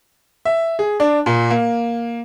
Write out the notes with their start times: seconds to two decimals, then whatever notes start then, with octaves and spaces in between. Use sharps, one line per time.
0.45 E5
0.79 G#4
1.00 D4
1.26 A#2
1.50 A#3